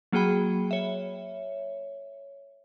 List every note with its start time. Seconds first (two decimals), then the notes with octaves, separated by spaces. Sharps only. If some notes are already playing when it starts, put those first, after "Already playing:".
0.12 F#3 A#3 F#4 G#4 G5 B5
0.71 C#5 E5